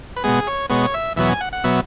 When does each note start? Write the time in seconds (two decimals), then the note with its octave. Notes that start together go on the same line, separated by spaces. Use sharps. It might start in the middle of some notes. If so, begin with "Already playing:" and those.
0.16 B4
0.24 B2 G#3 B3 G#4
0.47 C#5
0.69 B2 G#3 B3 C#5
0.94 E5
1.16 E2 B2 F#3 B3 E5
1.29 G#5
1.41 F#5
1.53 F#5
1.64 B2 F#3 B3 E5